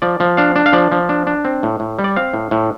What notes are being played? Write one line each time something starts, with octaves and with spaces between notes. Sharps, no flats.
F3 D5
F3
D4 F5
D4
F5
F3 D5
F3
D4
D4
C4
A2
A2
G3
D5
C4 F5
A2
A2